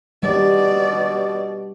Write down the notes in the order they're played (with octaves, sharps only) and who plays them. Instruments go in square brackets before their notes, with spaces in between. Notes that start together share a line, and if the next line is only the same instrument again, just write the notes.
[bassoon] B2 [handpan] G3 [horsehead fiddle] D5